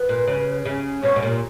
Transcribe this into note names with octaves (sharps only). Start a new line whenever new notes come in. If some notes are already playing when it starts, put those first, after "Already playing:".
Already playing: B4
A#2
C#3
C#3
B2 C#5
B2
A#2